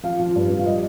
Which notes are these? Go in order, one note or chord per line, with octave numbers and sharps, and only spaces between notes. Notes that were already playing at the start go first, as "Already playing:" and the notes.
F3 F5
F3
G2
F3
F5
G3 D#5